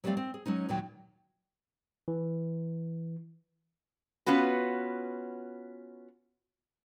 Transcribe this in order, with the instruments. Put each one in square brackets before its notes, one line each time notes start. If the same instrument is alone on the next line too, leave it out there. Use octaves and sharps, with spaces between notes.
[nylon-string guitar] F#3 G3 A3 C4 D5 F5
C4
G#4
F#3 G#3 C#4 D#4
D#2 A#2 D#3 F#3 G5
[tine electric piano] E3
[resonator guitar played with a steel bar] B3 C#4 F4 F#4 B4